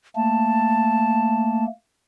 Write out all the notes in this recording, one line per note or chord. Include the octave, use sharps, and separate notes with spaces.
A3 A#3 A5